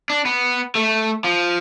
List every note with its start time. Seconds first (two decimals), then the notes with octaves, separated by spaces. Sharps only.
0.10 D4
0.26 B3
0.75 A3
1.24 F3